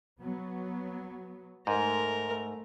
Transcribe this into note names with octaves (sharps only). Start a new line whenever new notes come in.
F#3 B3
G#2 A3 A#4